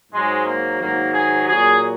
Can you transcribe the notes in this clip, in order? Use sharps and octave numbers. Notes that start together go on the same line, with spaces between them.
G#2 F#3 G#3
A#3
G#2 D#3 F#3 A#3
G#4
A#2 F#3 G#4